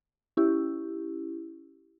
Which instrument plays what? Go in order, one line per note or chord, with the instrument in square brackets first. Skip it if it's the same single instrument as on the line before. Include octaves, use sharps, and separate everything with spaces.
[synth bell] C#4 E4 G4